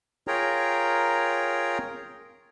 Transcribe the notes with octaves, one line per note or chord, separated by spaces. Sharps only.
F4 G#4 A#4 C#5 G5 A#5